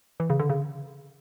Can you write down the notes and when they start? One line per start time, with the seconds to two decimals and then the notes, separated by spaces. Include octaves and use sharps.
0.20 E3
0.30 C#3
0.40 D3
0.50 C#3